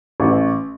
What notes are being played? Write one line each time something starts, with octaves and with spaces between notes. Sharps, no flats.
A1